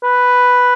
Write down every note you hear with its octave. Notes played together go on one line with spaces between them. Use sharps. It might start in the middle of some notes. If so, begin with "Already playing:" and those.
B4